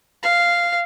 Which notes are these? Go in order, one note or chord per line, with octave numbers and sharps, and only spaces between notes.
F5